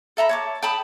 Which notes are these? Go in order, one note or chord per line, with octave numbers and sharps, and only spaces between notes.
A4 E5 A#5 B5
C#5 A5 D6
G5 A5 B5 D#6